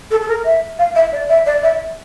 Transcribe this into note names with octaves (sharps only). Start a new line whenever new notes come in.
A4
A4
A#4
E5
F5
E5
D5
E5
D5
E5